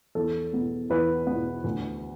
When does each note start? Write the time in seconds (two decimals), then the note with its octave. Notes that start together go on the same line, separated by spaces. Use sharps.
0.15 E2 A4
0.53 B2 B3
0.90 E2 B4
1.27 B2 B3
1.64 D2